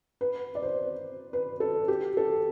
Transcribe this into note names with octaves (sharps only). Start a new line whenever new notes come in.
B4
D5
C5
B4
A4
G4
A4